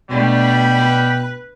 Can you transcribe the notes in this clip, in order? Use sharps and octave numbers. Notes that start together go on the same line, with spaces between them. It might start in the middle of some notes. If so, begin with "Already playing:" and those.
B2 G3 A3 D4 G5 B5
B4